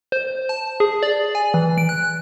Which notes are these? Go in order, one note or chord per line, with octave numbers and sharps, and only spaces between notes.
C5
A5
G#4
D5
G#5
E3
D7
F#6